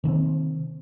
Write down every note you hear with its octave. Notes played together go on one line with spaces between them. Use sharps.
C3 D#3 A#3 C4